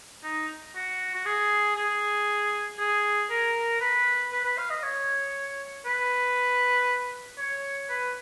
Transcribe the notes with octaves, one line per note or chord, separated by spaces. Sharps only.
D#4
F#4
F#4
G#4
G#4
G#4
A#4
B4
B4
B4
F5
D#5
C#5
B4
C#5
B4